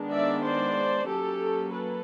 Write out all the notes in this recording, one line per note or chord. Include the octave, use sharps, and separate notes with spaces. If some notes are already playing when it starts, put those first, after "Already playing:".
Already playing: D#3 G#3 B3 D4
D5 E5
C5 D5
F#3 A#3 C#4 G4 A4
A4 B4